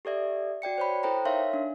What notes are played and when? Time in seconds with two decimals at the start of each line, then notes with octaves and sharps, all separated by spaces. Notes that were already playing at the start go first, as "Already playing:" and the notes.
0.05 G4 A4 D5 E5
0.62 F#4 D5 G5 C#7
0.78 C5 C#5 B5
1.03 E4 A4 C5 G5 A#5
1.25 D#4 A#4 C#5 E5 F5 C6
1.53 D4